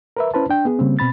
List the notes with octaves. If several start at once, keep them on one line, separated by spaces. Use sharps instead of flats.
A#4 B4 E5
C#4 E4 B4 C5 A5
D4 G5
B3 G#4
C#3 G3 A#3 C4
B2 C4 B5 A6